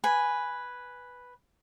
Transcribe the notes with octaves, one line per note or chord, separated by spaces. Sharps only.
B4 G#5